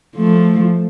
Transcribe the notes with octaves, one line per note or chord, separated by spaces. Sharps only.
F3 A3